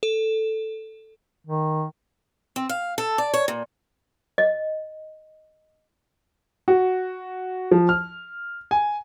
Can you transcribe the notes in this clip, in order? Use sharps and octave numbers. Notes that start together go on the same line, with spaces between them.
A4
D#3
C4
F5
A4
D5
C#5
A#2
D#5
F#4
F3
F6
G#5